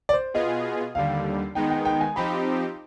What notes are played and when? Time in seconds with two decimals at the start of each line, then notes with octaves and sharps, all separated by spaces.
0.09 D5
0.13 C5
0.34 B2 B3 F4 G#4 D#5
0.95 D#2 D3 G3 F5
1.55 D#3 G#3 B3 D#4 G5
1.70 G5
1.85 G5
2.01 G#5
2.16 F3 C4 D#4 G4 B5